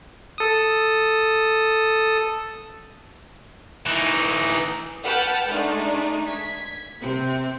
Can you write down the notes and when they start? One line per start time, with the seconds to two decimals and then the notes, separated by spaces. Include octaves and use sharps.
0.38 A4 D#6
3.86 E3 D#4
5.03 B4 F#5 G5 A5 F6
5.49 G#3 A3 D4 D#4
6.27 G#6 B6
7.01 C3 C4